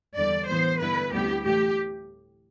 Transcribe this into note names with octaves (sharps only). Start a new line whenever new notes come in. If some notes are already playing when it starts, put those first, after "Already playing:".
E2 D3 G3 D5
A2 E3 B3 C5
G2 D3 G3 B3 E4 B4
D2 C3 G3 B3 E4 G4
A2 E3 A3 G4